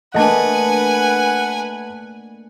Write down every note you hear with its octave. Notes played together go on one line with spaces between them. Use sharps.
A3 A#3 D4 B4 D#5 F#5 G#5 A5